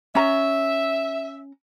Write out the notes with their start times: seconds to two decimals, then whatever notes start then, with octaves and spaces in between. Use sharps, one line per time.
0.15 C#4 E5 A#5